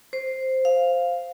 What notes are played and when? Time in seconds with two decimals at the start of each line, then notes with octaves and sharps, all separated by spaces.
0.13 C5
0.65 F5